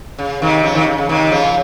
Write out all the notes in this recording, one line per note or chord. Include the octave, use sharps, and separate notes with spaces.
C#3
C3 D#3
C#3 F3
C3 D#3
C#3
C#3
C3 D#3
C#3 F3